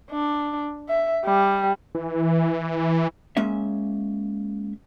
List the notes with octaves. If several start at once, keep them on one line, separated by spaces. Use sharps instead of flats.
D4
E5
G3
E3
G#3 A#3 C#4 E5